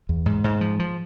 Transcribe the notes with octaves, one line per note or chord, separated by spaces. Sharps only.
E2
G#2
G#2
F3
F3